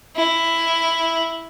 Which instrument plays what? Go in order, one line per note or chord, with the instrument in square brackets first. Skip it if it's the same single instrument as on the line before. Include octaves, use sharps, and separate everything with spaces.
[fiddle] E4